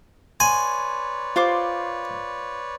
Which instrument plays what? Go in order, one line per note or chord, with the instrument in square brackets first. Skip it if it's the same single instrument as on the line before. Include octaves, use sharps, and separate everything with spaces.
[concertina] B4 C#5 D5 [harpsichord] G#5 [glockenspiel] C6
[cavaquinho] F4 C5 D6